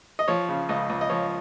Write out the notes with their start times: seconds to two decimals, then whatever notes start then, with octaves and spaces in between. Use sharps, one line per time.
0.19 D#5
0.28 F3 C#5
0.48 C#3
0.69 C#2 D#5
0.89 C#2
1.01 D#5
1.10 F3 C#5